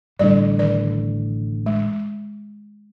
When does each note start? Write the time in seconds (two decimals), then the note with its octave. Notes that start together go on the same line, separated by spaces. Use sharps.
0.19 A1 A2 D3 G3 D5
0.59 D#3 D5
1.66 G#3